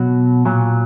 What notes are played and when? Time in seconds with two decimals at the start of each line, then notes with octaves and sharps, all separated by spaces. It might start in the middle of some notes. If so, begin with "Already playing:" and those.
Already playing: B2 F#3 F#4
0.46 A#2 F#3